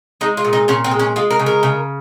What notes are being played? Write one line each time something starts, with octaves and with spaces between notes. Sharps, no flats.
G#3 D#4
F4
A#2
D#4
A#2 C#4
C4
G#3
C#4
G#3 F4
A#4
C#3
A#4
C#3